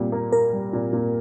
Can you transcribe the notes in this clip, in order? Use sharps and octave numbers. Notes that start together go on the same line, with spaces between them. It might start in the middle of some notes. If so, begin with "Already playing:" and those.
Already playing: A#2 G3
A#3
A#3 A#4
G3
A#2
A#2